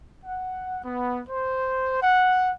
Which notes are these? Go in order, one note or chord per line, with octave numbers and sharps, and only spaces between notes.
F#5
B3
C5
F#5